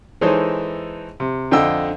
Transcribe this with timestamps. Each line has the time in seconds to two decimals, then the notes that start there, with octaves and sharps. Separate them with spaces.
0.21 E3 G#3 D#4 A4 C5 C#5
1.20 C3
1.51 F2 D3 D#5 G5 E6